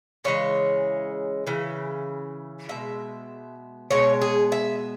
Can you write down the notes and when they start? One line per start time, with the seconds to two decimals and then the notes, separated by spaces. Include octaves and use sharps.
0.24 C#3 E3 G#3 C#5
1.47 C#3 E3
2.69 B2 G#3 E5
3.91 B2 G#3 C#5
4.22 G#4
4.52 E5